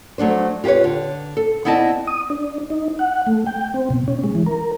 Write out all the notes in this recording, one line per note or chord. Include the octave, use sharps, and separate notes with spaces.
F#3 A3 D4 C5
F4 G4 G#4 B4 C#5
D3
A4
B3 C4 E4 D5 D#5 A5
D#6
D4
D#4
F#5
A3
G5
C4
B2
C#4
G#3
E3
A#4